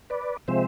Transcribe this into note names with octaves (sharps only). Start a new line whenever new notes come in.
B4 D5
C3 F3 G#3 C4 C5 E5